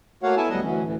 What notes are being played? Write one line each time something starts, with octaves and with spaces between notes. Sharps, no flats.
A3 A#3 F#4 C#5 F5 F#5
B3 E4 A4 E5 G#5 A5
D2 F#3 G3 B3 D#5 F#5
D2 E3 F#3 C#4
D2 A2 E3